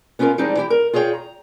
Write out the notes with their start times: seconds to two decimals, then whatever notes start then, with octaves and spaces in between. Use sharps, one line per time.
0.19 B3 C#4 F4 G4 A#4
0.38 E3 G3 G#3 C4 D4 D#4
0.55 E3 E4 G4
0.70 A#4
0.93 F4 G#4 C#5 E5 G5
1.13 A#5